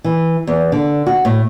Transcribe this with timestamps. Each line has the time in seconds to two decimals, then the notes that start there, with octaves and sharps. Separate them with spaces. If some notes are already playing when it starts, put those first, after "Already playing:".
0.04 E3
0.47 E2
0.72 D3
1.07 F#4
1.25 A2